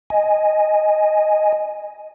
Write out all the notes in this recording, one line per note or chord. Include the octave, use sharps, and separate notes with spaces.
D#5 G#5